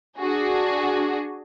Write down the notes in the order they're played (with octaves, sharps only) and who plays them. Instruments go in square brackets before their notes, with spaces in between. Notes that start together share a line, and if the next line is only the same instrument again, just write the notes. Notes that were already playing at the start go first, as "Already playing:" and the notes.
[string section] D4 F#4 G#4